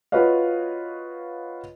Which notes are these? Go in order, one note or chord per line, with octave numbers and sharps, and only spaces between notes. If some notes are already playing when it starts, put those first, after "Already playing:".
F4 F#4 B4 C#5 D#5 F5